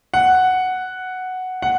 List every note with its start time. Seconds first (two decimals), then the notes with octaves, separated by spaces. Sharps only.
0.14 F#5
1.62 F#5